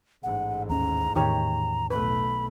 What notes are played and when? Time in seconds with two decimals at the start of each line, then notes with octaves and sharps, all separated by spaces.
0.23 A1 G#2 F#5
0.69 D#2 C#4 A#5
1.16 E2 A2 D#3 G4 C#5 A#5
1.90 B1 A3 B4 B5